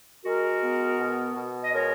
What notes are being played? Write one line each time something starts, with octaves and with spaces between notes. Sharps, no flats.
G#3 F#4 A#4
B3
B2
B2
D#5
G#3 A#4 C#5